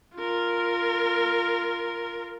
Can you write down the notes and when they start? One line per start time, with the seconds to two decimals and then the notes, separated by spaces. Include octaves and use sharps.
0.16 F4 A#4